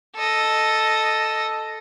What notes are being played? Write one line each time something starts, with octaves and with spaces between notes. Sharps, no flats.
A4 D#5